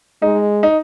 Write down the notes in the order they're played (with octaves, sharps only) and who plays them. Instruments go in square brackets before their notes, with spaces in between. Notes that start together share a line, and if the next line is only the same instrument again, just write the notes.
[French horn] G#3 [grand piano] D#4
[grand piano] D#4